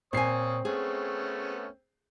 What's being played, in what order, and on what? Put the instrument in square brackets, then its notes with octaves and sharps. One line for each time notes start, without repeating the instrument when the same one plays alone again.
[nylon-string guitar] A#2 G#5 [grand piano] C4 C7 [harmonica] C#5 D#6
[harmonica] A3 B3 C#4 [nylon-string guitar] G#4